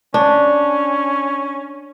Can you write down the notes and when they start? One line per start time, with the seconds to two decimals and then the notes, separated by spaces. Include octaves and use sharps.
0.14 C#4 D4